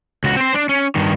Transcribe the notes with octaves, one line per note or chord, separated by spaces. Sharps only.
C#2 F#4
C4 C5
D4
C#4
G2 D#3